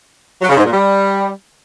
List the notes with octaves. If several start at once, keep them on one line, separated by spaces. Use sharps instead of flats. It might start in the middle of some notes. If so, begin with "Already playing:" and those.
F#3
C#3
G#2
A#2
G3